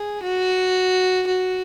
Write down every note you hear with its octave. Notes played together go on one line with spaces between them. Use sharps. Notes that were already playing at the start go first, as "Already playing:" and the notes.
Already playing: G#4
F#4
F#4